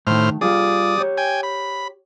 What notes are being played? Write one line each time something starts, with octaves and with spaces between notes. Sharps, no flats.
A2 D#3 A3 C5 F6
G3 F4 G#4 D5 D#6
G4 C#5
G5 G#5
B5